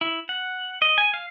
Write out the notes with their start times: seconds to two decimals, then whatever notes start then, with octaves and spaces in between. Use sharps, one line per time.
0.01 E4
0.29 F#5
0.82 D#5
0.98 G#5
1.14 F5